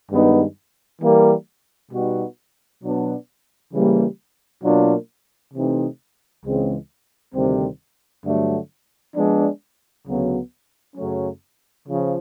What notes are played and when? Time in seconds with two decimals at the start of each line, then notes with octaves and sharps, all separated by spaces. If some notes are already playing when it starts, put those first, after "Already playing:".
0.11 G2 D#3 G#3 B3 D#4
1.02 E3 G3 A#3
1.91 B2 G3 B3 D#4 F#4
2.82 B2 F#3 B3 D4
3.73 C#3 E3 G3 A#3
4.63 B2 F#3 A#3 D4 F4
5.54 C3 E3 A3 C4 D#4
6.44 C#2 C#3 E3 G#3 C4
7.35 D2 C3 D#3 G3 C4
8.25 G2 D3 F#3 A3
9.16 F3 G#3 B3 D4
10.06 D2 C#3 F#3 B3
10.97 F#2 C#3 F#3 A3 C#4
11.88 C#3 F3